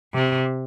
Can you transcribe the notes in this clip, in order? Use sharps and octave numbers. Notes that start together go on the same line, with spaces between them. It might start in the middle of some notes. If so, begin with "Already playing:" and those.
C3